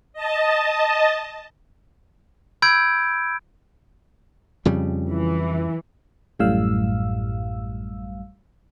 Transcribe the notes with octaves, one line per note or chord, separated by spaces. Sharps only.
D#5 A5
B5 E6 G6 G#6 D7
F2 C#3 G3
E3
A1 F#2 A2 G3 F5 E6